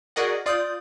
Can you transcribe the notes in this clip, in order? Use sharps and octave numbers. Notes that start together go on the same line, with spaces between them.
F#4 G#4 A#4 D5 D#5 F#5
F4 D5 D#6 G6